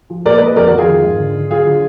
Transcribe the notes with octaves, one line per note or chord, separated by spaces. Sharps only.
F3
A#2 A#4 D5
B4 D#5
G#3
B4 D#5
F2 A#4 D5
F#4 A#4
F2
F4 G#4
D#3
G#2
D3
D3
F#3 F4 G#4
D3